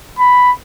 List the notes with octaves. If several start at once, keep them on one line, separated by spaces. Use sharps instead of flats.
B5